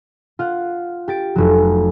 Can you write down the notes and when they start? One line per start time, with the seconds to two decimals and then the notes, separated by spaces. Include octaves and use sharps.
0.39 F4 F5 F#5
1.08 G4 A6 D7
1.36 F1 F#3